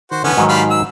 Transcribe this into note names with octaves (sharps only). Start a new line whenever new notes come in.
D#3 F#4 C5
D3 E3 B3 C#4
G#2 D#3 F#3
G3 F5 B5
E6